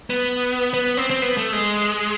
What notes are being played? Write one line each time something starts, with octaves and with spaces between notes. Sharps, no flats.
B3
B3
C4
C4
B3
A3
G#3